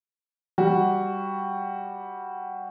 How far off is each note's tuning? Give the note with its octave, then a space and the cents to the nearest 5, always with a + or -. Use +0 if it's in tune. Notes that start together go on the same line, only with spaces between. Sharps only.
G3 +0 F#4 +0